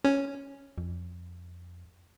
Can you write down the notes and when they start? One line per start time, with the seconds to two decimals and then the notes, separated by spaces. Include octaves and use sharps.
0.04 C#4
0.78 F2